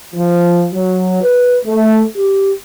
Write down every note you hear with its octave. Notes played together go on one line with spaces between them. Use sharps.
F3
F#3
B4
A3
G4